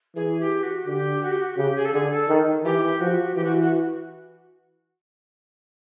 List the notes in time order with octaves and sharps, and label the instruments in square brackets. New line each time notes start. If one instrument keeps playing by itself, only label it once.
[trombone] E3 [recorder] G#4
[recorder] G4
F#4
[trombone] D3 [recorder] G4
[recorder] F#4
G4
F#4
[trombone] C#3 [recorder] G4
[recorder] G#4
A4
[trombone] D3 [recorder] G#4
[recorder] A4
[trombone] D#3
[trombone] E3 [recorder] G4
[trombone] F3 [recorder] F#4
[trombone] E3 [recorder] G4
[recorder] F#4
F#4